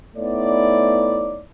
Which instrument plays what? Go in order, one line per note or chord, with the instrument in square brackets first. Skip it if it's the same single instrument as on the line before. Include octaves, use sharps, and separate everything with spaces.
[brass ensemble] A3 B3 D#4 E4 C#5 D5